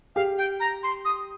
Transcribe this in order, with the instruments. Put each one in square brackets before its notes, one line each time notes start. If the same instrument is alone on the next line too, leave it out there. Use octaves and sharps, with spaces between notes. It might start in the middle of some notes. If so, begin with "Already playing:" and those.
[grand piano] G4 [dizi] F5
[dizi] G5
A#5
C6
D#6